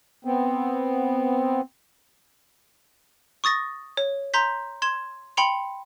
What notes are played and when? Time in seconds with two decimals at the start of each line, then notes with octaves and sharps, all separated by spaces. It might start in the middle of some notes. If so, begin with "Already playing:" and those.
0.25 B3 C4
3.44 C#6 D#6 A6 A#6
3.97 C#5
4.34 A#5 C6 G6 B6
4.82 C6 G#6 E7
5.37 G5 B5 C6 C#7 F7